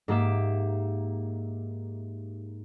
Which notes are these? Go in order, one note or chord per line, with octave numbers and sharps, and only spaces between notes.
G#2 A#3 G4 E5